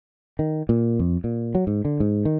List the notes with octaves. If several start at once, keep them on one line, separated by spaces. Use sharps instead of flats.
D#3
A#2
F2
A#2
F#3
G#2
D3
G#2
D#3